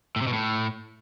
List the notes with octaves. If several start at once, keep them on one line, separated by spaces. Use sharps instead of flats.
A2
C3
B2
A2